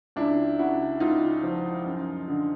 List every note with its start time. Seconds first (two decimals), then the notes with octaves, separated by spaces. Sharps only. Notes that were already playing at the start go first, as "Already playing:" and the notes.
0.16 C#2 D4 E4
0.59 C#3 E4 F#4
1.00 C#2 D#4 F4
1.43 F3
1.86 F#2
2.28 D3